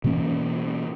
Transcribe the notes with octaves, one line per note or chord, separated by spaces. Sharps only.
B2 E3 A#3 C#4